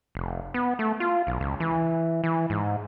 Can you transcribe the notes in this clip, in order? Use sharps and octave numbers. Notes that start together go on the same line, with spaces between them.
F1
B3
A3
F4
B1
C#2
E3
E3
G#2